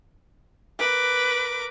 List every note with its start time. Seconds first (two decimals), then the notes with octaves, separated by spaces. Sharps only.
0.79 A#4 B4 D6